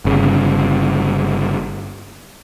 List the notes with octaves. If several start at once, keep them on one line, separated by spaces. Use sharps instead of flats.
G1 C#3